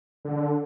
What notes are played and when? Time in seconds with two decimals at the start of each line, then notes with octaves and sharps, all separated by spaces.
0.25 D3